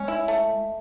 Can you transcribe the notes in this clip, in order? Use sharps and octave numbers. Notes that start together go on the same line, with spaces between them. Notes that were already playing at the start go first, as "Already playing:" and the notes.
Already playing: G#3 C#4
E4
A3